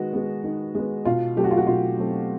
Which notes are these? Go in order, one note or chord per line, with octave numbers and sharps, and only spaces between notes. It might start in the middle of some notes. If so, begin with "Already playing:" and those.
Already playing: D#3 G#3 B3 F#4
G#3 B3
D#3
G#3 B3
B2 F4
F#3 A3 C4 G4
F#4
F4
F#4
B2 F4
F#3 A3 C4